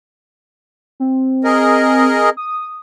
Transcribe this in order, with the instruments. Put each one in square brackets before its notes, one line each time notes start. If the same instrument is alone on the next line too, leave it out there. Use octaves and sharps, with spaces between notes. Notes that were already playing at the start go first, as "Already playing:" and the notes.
[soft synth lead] C4
[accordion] G#4 A#4 D#5
[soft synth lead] D#6